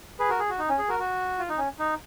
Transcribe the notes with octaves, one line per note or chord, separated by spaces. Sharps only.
G#4 B4
F#4 A#4
G#4
F#4
D#4
C#4
G#4
F#4 A#4
F#4
F4
D#4
C#4
D#4